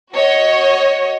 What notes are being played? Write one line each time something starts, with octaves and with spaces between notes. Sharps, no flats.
F#4 C#5 D#5